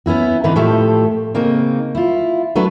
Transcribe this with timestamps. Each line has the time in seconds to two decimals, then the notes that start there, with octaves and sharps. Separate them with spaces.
0.06 B3 C#4 E4 F#4
0.44 G#2 D3 E3 C4 D#4 B4
0.55 A2 F3 A3 G4 A4
1.34 C#3 A#3 C4 D#4
1.95 E4 F4
2.55 F#3 A3 D4 B4